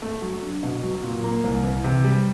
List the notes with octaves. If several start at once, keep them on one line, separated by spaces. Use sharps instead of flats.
A3
F#3
D4
B2
F#3
A#2
A#3
C2
E3
C3
G3